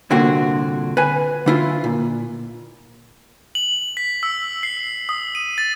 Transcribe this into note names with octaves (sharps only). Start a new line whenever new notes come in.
C2 A#2 D3 C4 F#4
B4 G#5
D3 E4 F4
A#2
F#7
B6
E6
C7
D#6
D#7
A6